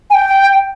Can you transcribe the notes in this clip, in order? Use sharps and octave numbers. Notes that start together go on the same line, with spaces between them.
G#5
G5